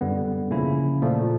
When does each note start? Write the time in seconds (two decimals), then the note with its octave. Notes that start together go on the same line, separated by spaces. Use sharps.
0.01 F#2 D3 G3 B3
0.51 C#3 F3 A#3 C#4 E4
1.02 A#2 F3 A3